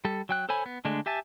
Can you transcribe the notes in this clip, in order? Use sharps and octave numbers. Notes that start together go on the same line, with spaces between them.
G3 A4
F#3 G5 F#6
A4 C5 C#5 G#5 B5
B3
D3 G#3 A3 D4
G4 E5 G#5 A5